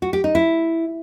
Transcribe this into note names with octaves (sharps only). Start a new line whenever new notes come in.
F#4
G4
D#4
E4